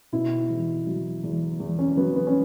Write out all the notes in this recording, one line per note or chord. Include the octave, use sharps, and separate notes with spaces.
B2 E4
E2
F#3
E2
E2
C#4
F#3 B3
B3
C#4